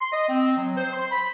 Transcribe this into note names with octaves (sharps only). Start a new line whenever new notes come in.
C6
D#5
C4
F#3
C5
C6
B5